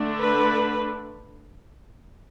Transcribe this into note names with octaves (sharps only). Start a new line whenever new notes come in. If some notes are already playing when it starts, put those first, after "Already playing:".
Already playing: D3 A3 D4
B4